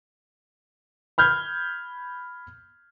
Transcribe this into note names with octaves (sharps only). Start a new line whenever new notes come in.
B5 F6 G6 G#6